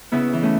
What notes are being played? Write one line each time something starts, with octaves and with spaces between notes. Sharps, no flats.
C#3 B3 E4
E3
A3 C#4